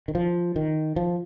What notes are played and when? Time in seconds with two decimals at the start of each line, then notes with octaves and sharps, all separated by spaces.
0.08 D#3
0.15 F3
0.56 D#3
0.96 F3